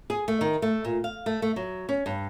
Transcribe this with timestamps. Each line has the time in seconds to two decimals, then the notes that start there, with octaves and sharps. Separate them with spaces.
0.10 G#4
0.28 A3
0.41 D#3
0.62 A3
0.85 A#2
1.04 F5
1.26 A3
1.42 A3
1.56 F#3
1.89 C#4
2.06 G2